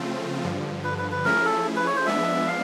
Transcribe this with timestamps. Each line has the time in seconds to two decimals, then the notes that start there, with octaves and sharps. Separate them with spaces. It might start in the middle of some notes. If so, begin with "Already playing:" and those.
Already playing: C#3 F3 A3 C4 F4
0.44 G2 D3 F3
0.84 B4
0.98 B4
1.11 B4
1.25 F3 A3 C#4 E4 G#4 A#4
1.45 A4
1.76 B4
1.86 C#5
1.96 C5
2.06 F3 G#3 B3 D4 E5
2.47 F5